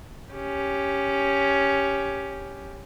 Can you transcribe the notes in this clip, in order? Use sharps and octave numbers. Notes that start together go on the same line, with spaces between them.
C#4 G4